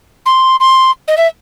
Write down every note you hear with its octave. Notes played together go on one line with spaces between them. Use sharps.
C6
C6
D#5
E5